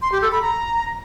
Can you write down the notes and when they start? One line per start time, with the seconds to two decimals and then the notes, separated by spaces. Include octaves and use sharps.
0.02 C6
0.12 G4
0.22 A4
0.32 B5
0.42 A#5